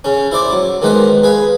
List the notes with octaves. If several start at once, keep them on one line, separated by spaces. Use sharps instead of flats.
C#3 C#4
E4 C5 D5 D6
F#3
D#3 G#3 B3 B4 C5
G#4 B4 F5